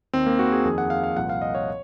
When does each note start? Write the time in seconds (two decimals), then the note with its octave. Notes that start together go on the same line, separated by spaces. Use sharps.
0.14 D#2 D#3 C4
0.26 A#3
0.39 F#4
0.52 G#4
0.65 F2 D#3 G#4
0.78 F#5
0.90 F5
1.04 F5
1.16 C2 A#2 F3 F#5
1.29 F5
1.42 D#5
1.55 C#5